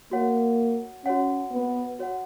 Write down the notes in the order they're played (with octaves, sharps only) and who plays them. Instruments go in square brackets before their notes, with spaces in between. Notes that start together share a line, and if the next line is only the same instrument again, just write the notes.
[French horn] A#3 [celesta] F#4 C#5 F#5
[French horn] C#4 [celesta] F#4 C#5 F#5
[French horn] B3
[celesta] F#4 C#5 F#5